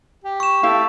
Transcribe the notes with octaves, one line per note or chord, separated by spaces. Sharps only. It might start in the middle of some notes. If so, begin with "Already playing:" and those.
G4
C#6 E7
A3 E4 G4 F5